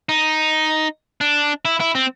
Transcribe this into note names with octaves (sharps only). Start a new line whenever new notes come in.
D#4
D4
E4
E4
C4